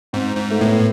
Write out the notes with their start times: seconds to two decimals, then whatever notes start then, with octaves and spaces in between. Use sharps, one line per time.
0.13 G#2 C4
0.37 G#2
0.50 A3
0.61 A2 B3